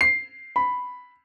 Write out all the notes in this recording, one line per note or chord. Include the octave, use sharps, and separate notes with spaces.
C7
B5